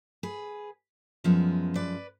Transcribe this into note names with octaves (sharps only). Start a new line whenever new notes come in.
G#4 B4
F#2 F3 G#3 B3
B4 D5